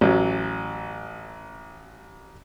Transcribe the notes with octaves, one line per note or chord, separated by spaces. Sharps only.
A1 F#3